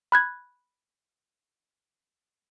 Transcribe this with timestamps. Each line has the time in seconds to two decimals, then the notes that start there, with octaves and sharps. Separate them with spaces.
0.12 B5 F#6 G#6